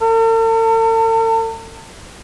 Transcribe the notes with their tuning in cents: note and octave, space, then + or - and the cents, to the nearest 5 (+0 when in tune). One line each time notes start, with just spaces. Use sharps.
A4 +45